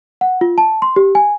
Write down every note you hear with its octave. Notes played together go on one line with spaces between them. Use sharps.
F#5
F4
A5
C6
G4
G#5